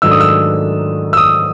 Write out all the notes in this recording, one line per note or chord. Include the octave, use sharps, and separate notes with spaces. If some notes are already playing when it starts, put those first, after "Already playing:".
G#2 D#3 F#3 A3 D4 E6
D#6
E6
E6
D#6